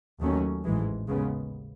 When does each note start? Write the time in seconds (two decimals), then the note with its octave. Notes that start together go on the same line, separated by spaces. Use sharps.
0.20 D#2 D#3 F#3 A3 C#4
0.64 A1 G#2 E3 G#3
1.07 D#2 C#3 G#3 B3